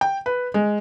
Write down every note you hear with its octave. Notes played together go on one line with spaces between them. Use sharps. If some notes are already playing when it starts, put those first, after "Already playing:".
G5
B4
G#3